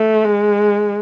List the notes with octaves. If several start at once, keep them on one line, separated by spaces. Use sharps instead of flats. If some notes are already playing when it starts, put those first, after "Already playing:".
Already playing: A3
G#3